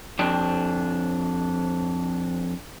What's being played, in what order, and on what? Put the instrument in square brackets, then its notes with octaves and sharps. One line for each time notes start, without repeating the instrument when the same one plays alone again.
[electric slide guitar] F2 D4 G5